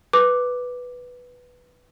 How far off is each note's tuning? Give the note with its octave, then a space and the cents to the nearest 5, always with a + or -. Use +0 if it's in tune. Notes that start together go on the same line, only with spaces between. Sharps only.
B4 +0 D6 +0